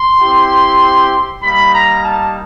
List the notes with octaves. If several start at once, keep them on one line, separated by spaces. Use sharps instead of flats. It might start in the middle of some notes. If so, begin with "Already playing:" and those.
Already playing: C6
C4 E4 G4
G3 A#3 D#4 B5
A#5
A5